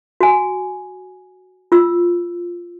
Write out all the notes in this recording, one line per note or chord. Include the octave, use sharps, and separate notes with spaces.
F#4 G#5
F4 E6